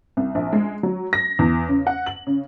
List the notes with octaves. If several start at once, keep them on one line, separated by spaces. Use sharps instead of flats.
C2
A#1
G#3
F#3
A#6
E2
C#3
F#5
F#7
C#3